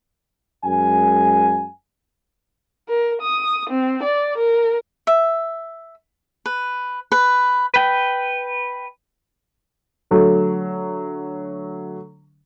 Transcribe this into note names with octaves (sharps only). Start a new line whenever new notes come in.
F#2 G#3 G#5
A#4
D#6
C4
D5
A#4
E5
B4
B4
B4 G5
D3 F#3 A3